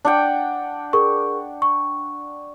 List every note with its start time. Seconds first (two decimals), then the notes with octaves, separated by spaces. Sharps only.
0.05 D4 F#5 G5
0.93 G#4 A#4 C#6
1.62 C#6